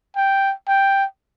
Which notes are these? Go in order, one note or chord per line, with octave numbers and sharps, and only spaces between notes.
G5
G5